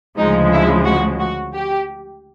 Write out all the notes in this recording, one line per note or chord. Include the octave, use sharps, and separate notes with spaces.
D2 C#3 F3 G#3 D#4
E4
F#4
F#4
G4